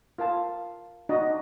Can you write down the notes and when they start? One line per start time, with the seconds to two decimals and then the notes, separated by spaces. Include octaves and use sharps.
0.18 F4 A#4 F5 A5
1.09 D4 D#4 F#4 D5 D#5